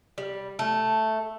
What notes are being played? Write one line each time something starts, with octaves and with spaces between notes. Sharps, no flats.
G3
A3